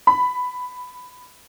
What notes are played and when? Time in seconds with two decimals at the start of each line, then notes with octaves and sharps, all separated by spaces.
0.07 B5